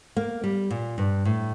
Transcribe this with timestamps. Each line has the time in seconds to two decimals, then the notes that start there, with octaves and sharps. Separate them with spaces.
0.17 A#3
0.44 G3
0.71 A#2
0.98 G2
1.25 A2